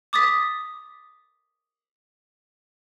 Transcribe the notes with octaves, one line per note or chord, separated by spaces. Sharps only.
D6 D#6 A6 B6